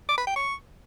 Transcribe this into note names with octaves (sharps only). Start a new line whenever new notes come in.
D6
B5
G5
C#6